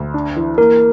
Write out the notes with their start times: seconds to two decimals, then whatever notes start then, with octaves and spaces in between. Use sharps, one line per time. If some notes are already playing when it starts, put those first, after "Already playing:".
Already playing: D2
0.14 D4
0.36 E3
0.58 A#3 A#4